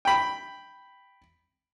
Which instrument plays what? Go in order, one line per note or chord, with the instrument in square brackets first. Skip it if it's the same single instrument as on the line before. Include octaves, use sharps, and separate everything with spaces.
[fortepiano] G5 B5